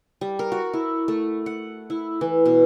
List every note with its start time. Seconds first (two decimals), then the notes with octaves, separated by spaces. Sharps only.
0.21 G3
0.39 A#4
0.52 F#4
0.73 E4
1.08 A3
1.46 F#5
1.90 E4
2.21 E3
2.46 B2